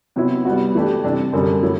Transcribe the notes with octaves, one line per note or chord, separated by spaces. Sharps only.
C3 F#3 B3 E4
G3 B3 F#4
E3 A3 D4 G4
C3 G3 D4
F#2 D3 G3
F#3 A3 E4